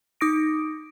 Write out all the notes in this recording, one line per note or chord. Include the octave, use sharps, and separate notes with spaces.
D#4 D6 D#6 A#6 D7